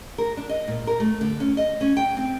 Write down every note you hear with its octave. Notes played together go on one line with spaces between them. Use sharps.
A#4
D4
D#5
A#2
A#4
A3
D3
C#4
D#5
C#4
G5
C4